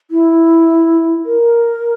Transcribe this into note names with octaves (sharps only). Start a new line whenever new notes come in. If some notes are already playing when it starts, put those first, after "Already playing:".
E4
A#4